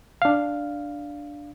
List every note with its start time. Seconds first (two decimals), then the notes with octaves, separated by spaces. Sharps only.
0.22 D4 F5